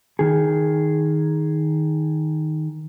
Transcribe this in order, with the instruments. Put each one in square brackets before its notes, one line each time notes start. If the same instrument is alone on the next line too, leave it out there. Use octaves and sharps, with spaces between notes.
[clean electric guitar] D#3 G#4